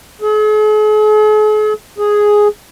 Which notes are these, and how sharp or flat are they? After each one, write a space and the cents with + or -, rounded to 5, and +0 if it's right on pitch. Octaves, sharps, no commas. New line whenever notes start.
G#4 +45
G#4 +0